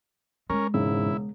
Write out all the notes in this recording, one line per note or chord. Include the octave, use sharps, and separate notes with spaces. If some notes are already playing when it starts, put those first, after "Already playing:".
G#3 C#4 A#4
E1 G#2 C#3 E4